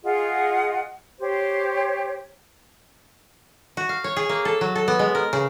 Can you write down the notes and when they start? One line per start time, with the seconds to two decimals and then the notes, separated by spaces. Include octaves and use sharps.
0.04 F4 G#4 D#5 F#5
1.20 G4 C5 C#5
3.77 F#4
3.89 F5
4.04 C#5
4.17 G#4
4.29 A#3
4.45 A4
4.61 F#3
4.76 A4
4.88 B3
4.99 G#3
5.15 A#4
5.33 C#3